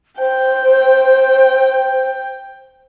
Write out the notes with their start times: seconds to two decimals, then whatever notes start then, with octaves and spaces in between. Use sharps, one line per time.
0.19 C5 G5